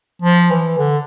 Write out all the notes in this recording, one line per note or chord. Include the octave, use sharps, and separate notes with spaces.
F3
E3
D3